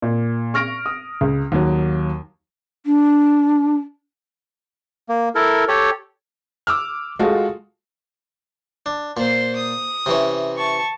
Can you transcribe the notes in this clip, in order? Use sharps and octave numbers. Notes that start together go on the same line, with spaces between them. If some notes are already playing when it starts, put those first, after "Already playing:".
A#2
C#6 F6 A#6 D7
D#6
C#2
D#2 F#3
D4
A#3
E4 A4 A#4
G4 A4 C#5
D6 E6 F6
G#3 F4 F#4 A4
D4
A#2 C5 C6
D#6
C3 E3 C#4
A5 C#6